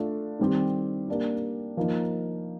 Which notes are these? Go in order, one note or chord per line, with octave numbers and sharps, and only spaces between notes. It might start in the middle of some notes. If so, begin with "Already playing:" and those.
Already playing: A3 D4 F4 A4
D#3 G3 C4 G4
A#3 D4 G4
F3 A#3 D#4